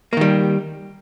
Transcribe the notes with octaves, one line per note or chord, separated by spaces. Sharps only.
D#3 G3 A#3